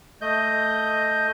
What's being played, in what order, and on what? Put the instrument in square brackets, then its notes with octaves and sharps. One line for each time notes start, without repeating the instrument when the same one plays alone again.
[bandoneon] A3 D#5 G6